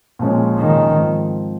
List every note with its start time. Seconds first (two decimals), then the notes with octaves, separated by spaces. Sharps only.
0.19 A#2 F3 G#3 C#4
0.58 D#3
0.95 G#2 F3 C4